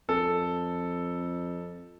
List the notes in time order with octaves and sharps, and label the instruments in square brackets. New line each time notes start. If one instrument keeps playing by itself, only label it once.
[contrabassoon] F2 [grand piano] A4